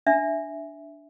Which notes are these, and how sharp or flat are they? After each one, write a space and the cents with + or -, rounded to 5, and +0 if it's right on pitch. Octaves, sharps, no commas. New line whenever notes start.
D4 +0 E5 +0